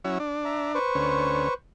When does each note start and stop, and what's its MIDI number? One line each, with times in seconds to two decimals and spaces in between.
0.04 0.18 54
0.04 0.18 61
0.04 0.18 64
0.20 0.79 62
0.45 0.72 76
0.45 0.72 82
0.75 1.54 71
0.75 1.54 72
0.75 1.54 85
0.95 1.48 38
0.95 1.48 61